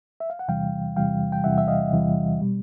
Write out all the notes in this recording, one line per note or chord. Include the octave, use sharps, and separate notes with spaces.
E5
F5
F#5
E2 C3 E3 G3 F5 G5
E2 C3 E3 G3 F5 G5
G5
E2 C3 E3 G3 E5 F#5
E5
D#5 F5
E2 C3 E3 G3
B2 G3